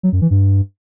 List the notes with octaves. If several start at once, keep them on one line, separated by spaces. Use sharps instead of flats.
F#3
F#2
E3
G2